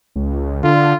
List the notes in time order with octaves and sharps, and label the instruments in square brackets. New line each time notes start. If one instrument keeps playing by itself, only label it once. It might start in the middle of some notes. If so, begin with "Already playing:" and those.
[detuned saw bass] C#2
[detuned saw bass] D3 [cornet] F4